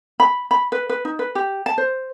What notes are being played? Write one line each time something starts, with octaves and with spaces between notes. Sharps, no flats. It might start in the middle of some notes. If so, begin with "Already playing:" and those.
B5
B5
B4
B4
D#4
B4
G4
A5
C5